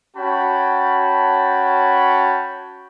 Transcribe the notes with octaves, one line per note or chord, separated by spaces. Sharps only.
C#4 F#4 C#5 G5 A5 B5